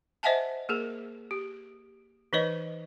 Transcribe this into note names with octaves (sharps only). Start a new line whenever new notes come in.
C5 D#5 E5 F#5 G#5 A5
A#3 G#4 A#4
G4
E3 D#4 B4 C#5 D#5